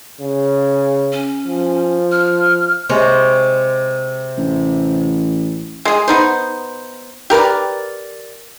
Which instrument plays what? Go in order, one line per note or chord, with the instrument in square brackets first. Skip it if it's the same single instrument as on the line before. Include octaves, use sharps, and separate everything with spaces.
[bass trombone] C#3
[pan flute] C#4
[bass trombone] F3
[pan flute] F6
[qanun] C3 G#3 C#5
[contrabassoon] A1
[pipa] G#3 G#4
B3 D#4 C5
G4 A#4 B4 D5